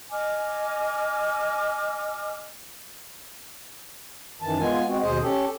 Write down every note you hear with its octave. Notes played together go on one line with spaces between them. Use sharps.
D#5 G#5 D6 F6
F#2 D#3 E3 A5
G#3 B3 F4 G#5
G#3 C4 F#4
D#2 B2 G#4 C5 D#5
C#4 G4 A4